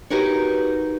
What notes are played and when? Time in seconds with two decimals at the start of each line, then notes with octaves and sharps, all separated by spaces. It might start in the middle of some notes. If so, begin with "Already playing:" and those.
0.10 D#4 F#4 G4 A#4 B4 C#5